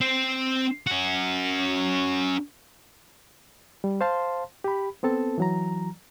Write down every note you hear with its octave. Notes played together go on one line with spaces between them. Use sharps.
C4 C5
C#4 F#4
G3
C5 F5 A5 C6
G4 B5
B3 C4 A4 A5
E3 F#3 A#5